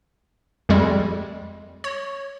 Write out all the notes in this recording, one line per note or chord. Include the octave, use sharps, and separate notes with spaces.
F2 G3 G#3
C#5